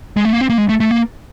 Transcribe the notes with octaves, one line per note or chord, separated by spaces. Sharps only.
G#3
A3
A#3
C4
A#3
G#3
A3
A3
A#3